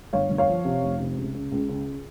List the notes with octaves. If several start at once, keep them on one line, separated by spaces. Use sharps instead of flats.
G1 C#5 F5
G1
C#5 F5
F3
C3
F1
C3
C#2
C#3
C#2
C#3